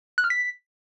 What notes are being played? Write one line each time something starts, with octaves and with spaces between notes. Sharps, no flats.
F#6
F6
B6